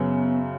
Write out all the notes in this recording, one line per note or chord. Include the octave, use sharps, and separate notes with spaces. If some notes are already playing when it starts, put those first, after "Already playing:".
Already playing: F#2 C#3 F#3 B3